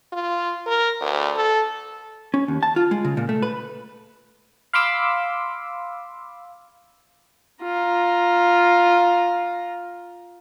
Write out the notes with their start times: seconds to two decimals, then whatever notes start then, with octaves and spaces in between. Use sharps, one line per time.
0.13 F4
0.66 A#4
1.01 D2
1.36 A4
2.34 C#4
2.48 D#2
2.63 A5
2.76 F4
2.91 G#3
3.05 C#3
3.17 A#2
3.29 A3
3.42 B4
4.73 F5 B5 C6 D6 E6
7.63 F4 A#5